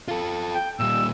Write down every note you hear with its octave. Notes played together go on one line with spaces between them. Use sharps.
F4 A4
G5
A#2 G3 E6